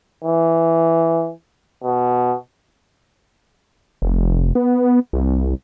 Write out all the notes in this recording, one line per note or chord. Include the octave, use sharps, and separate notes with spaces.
E3
B2
F1
B3
C2